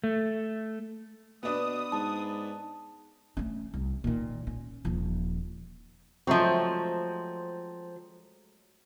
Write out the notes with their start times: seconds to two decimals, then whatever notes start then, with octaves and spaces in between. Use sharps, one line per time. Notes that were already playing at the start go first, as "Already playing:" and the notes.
0.04 A3
1.43 B2 B3 D4 B4 D#6
1.92 G#2 A5
3.37 A3 C#4
3.74 C2
4.04 A#2 D#3
4.47 C#4
4.85 D#1 F3
6.27 F3 F#3 G#3 A3 C4